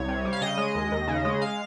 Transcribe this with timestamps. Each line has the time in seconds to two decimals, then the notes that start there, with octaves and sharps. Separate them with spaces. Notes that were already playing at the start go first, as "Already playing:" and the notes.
Already playing: C2 C#5
0.08 C3
0.25 G3
0.33 F5
0.42 C#3 D#5
0.58 G#3
0.75 D#2
0.92 D#2
1.08 C#3
1.25 G#3
1.42 F5